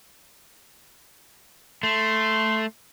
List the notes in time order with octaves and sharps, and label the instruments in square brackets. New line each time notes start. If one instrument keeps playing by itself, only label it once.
[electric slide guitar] A3 [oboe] C6